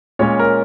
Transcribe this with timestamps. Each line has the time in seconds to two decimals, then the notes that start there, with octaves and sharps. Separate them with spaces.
0.19 A#2 G#3 C#4 C#5
0.39 A#4